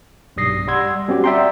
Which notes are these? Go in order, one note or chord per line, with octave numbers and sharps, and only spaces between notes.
B1 G2 G3 D#6 A#6 C7
G3 F#5 C6 E6 G#6
G3 C4 C#4 F#4 G4
D5 E5 F#5 G5 A#5 C6